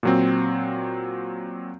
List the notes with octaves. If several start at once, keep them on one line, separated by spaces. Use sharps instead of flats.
A#2 F#3 C4